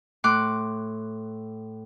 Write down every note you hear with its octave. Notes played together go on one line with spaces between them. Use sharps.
A2 C6 D6 F#6